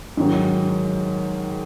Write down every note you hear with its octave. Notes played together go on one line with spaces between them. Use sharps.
G#2 D#3 F#3